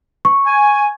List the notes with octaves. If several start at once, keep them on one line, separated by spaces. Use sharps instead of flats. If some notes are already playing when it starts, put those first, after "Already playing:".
C#6
G#5